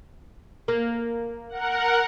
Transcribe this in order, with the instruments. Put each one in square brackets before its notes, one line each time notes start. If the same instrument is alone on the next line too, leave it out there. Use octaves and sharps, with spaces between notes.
[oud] A#3
[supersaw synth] A#4 F#5